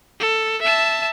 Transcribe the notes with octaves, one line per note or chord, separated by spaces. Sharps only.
A4
E5 A5